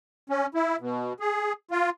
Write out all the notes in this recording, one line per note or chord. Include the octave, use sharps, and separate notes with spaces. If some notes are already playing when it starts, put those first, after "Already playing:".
C#4
E4
B2
G#4
F4